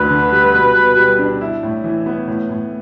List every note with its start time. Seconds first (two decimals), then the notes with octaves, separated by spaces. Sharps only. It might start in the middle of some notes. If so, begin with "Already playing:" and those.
Already playing: D2 D4 B4
0.11 D3
0.32 G3
0.54 B2
0.75 B2
0.97 G3
1.19 D4
1.41 E4
1.63 A2
1.84 E3
2.06 B3
2.28 A2
2.49 A2